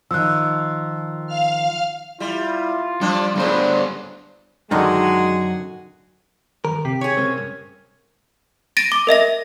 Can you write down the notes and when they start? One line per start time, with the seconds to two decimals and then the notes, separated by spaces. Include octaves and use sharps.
0.11 D#3 F3 E6 F#6
1.27 F5 F6
2.20 G3 E4 F4
3.01 F3 G3 D4
3.36 A2 C#3 G3 B3 D4 B4 C5
4.71 F#2 D3 D#3 G#3 D#4 F#4 G#4 F#5
6.65 G2 D#3 A#4
6.85 C3 G4 B6
7.01 G#4 C#5
7.17 C#3 G#3 C4 A#4
7.36 C2 G2
8.77 A6 A#6 D7 D#7
8.92 D6
9.07 A#4 D#5 E5 A#6